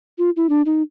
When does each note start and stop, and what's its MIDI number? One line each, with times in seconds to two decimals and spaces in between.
0.18 0.30 65
0.36 0.49 64
0.49 0.62 62
0.66 0.82 63